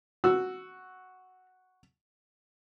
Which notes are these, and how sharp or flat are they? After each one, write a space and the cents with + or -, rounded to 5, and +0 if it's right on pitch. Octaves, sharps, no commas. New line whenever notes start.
F#4 +0 E6 +0